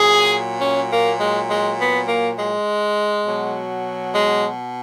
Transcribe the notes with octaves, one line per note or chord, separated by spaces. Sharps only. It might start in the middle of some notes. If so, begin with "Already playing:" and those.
Already playing: A#2 F#3 G#4
C#4
A#3
G#3
G#3
B3
A#3
G#3
B2 F#3
G#3